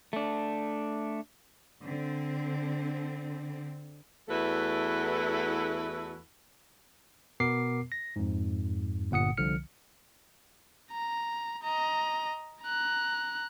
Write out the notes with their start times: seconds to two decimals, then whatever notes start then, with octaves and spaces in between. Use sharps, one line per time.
0.13 A3 D4
1.85 D3 C4
4.29 E2 A3 E4 F#4 A4 B4
7.40 B2 B3 A#4 D6 C7
7.92 A#6
8.16 F2 G#2
9.11 G1 A#2 F#5 D#6 C#7
9.37 C2 D3 F3 F6 C#7
10.92 A#5
11.63 D#5 A#5
12.63 A#5 F#6